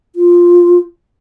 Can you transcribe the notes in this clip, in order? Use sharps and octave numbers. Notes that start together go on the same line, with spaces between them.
F4